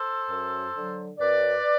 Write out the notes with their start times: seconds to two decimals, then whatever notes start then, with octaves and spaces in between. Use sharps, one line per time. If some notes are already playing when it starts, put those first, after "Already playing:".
Already playing: A4 C5
0.28 F#2
0.74 D3 F#3
1.19 F#2 B4 D5